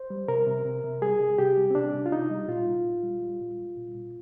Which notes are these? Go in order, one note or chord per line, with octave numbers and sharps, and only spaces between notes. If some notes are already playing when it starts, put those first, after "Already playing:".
Already playing: C5
G3
C3 A#4
C3
C3
C3
G3 G#4
C3
C3 G4
G3
C4
C3 D4
C3
F4
C3 D#4
G3
A#2 F4
A#2
A#2
G3
G3
A#2
G3
A#2
A#2